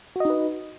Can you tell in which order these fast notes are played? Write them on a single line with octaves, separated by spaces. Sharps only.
F#4 D#5 D#4 B4